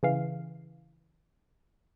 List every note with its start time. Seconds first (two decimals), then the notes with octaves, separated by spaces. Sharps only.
0.03 C#3 E3 F5